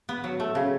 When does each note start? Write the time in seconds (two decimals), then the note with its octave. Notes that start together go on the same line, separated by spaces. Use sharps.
0.09 B3
0.24 F#3
0.40 A3
0.55 C#3